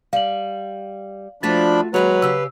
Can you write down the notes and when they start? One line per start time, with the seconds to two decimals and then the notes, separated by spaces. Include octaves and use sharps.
0.13 G3 F5 F#7
1.43 F3 A3 D4 F4 F#4 B5 A6
1.94 D#2 F#3 G#3 B4 A#5
2.22 C#3 G4 F5 E6